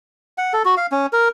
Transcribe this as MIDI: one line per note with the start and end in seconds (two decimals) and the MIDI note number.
0.38 0.53 78
0.53 0.63 69
0.65 0.75 66
0.77 0.87 77
0.92 1.06 61
1.13 1.28 70